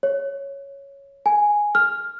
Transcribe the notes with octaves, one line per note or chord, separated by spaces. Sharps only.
C#5
G#5
F6